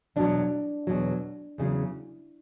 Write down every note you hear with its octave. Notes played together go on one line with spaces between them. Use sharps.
E2 B2 F#3 D4
E2 B2 F#3
E2 C#3 F#3